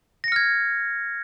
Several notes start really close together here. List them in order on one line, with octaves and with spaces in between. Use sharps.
A#6 C#7 F6 G#6